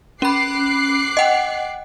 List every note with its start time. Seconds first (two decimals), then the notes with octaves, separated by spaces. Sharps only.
0.22 C#4 B5 D6 F#6 C7
1.17 D#5 F#5 G5